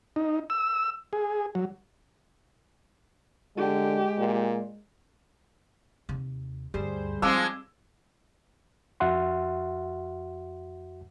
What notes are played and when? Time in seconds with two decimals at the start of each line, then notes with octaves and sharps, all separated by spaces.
0.16 D#4
0.50 E6
1.13 G#4
1.55 F#3
3.58 D3 G#3 G4
4.18 A#2
6.09 D#2 C3
6.74 D2 G2 G3 G#4 C5
7.22 F3 G#3 C4 D6 E6
9.00 F2 F#4 E5 F#5 C6